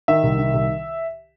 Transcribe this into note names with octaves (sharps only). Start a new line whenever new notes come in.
D#3 E5
C2
D#3
C2